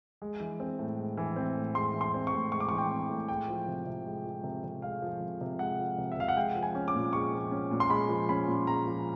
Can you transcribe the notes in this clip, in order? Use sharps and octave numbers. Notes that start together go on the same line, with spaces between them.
G#3
E3
C4
A2
G#3
E3
C4
A2
G#3 C6
E3
C6
C4
C#6
A2
G#3 C#6
D6
C#6
E3
G5
C4
A2
G#3 G5
F3
C3
C3
G#3
F3
C3
C3
G#3 F5
F3
C3
C3
G#3 F#5
F3
C3
E5
C3 F5
F#5
G#3 G5
F3
G#5
C#4
D6
A#2
G#3 C#6
F3
C#4
A#2
C6
G#3 B5
F3
C#4 B5
A#2
G#3 A#5
F3